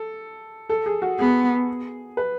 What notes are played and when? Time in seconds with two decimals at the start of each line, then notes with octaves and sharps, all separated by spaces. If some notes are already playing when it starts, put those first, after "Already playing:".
Already playing: A4
0.69 A4
0.86 G#4
1.02 F#4
1.19 B3 G#4
2.17 B4